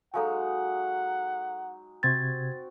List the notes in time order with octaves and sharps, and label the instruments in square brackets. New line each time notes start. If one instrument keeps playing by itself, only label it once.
[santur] F#3 G#3 D#4 [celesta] A4 F5 G#5 [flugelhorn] F#5
[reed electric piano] C3 G#6 [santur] C4 F#4 [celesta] A6